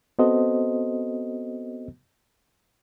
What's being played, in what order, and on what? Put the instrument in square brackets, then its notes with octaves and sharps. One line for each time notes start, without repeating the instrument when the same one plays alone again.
[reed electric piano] B3 C4 F#4 A4 C5 D#5